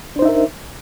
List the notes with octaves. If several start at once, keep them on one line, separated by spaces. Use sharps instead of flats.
D4 D#4 A#4 C5 E5